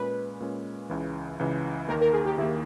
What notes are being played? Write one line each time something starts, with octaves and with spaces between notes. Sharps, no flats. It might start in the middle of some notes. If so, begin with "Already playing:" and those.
Already playing: A#2 G#3 C#4 B4
A#2 G#3 C#4
C#2 C#3 E3
C#2 C#3 E3
D#2 D#3 A#3 A#4
A#4
G#4
G4
D#2 D#3 A#3 E4